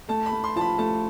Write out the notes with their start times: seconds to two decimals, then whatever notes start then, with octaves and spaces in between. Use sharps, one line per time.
0.09 A3 A5
0.26 B5
0.32 A3
0.44 C6
0.56 F3 A5
0.61 B5
0.78 A3 A5